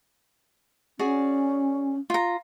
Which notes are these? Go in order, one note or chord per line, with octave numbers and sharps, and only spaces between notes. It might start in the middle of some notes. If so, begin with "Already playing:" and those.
C#4 F#4 G#4 D5
F4 A#5